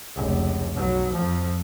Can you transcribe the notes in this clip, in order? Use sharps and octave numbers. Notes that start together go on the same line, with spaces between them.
F1 C#2
B1 F#3
F2 F3